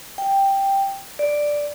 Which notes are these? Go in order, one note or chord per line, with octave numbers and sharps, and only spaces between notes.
G5
D5